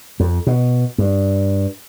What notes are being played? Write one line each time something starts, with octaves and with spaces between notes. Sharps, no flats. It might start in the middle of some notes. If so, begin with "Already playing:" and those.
F2
B2
G2